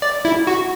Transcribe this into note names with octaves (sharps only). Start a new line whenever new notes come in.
D5
E4
F#4